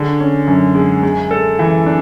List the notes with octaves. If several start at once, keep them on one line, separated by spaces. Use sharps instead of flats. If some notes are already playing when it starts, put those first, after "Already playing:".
Already playing: D3 G#4
C#4
F#2
G#3
G#3
A4
E3
D4